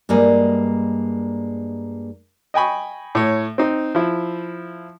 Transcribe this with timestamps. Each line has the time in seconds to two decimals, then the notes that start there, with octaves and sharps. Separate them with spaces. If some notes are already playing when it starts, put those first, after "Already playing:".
0.09 G2 G3 G#3 A#3 D#5
2.54 D#5 G5 G#5 B5 C#6
3.15 A2 C#5
3.58 C4 D#4
3.95 F3 E4